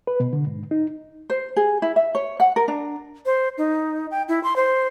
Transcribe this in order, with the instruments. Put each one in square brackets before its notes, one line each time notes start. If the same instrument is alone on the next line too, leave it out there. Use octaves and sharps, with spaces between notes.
[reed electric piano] B4
B2
D3
G#2
D#4
[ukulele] C5
G#4
E4
E5
C#5
F#5
A#4
D4
[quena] C5
D#4
G5
E4
C6
C5